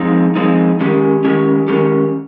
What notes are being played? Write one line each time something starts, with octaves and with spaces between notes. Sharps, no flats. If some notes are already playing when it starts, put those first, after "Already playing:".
Already playing: F3 G#3 C4 D#4
F3 G#3 C4 D#4
D#3 G#3 C#4 G4
D#3 G#3 C#4 G4
D#3 G#3 C#4 G4